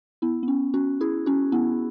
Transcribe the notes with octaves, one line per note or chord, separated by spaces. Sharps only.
B3 E4
B3
C#4
C#4 F#4
E4 G#4
C#4 F#4
B3 E4